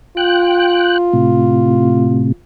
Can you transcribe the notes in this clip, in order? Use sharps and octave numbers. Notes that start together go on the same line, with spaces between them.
F4 G5 F#6
A2 C3